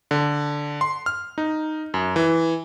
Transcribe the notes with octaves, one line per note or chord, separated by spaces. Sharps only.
D3
C6
F6
D#4
F#2
E3